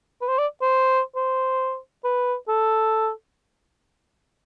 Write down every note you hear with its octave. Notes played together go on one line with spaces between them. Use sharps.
B4
C5
D5
C5
C5
B4
A4